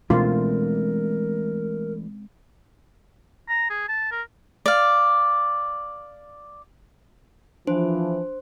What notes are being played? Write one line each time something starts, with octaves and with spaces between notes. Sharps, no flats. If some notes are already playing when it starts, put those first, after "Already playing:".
B2 E3 G#3 A3 C4 D4 F4 A#4
A#5
G#4
A5
A#4
D5 F5
E3 F3 D4 C5